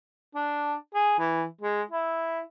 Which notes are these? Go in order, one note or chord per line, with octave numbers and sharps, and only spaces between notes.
D4
G#4
E3
G#3
E4